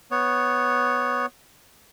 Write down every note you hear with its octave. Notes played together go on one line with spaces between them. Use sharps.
B3 C#5